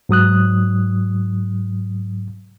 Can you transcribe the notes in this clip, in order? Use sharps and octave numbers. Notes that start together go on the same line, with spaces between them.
G#2 F#3 D#6 F#6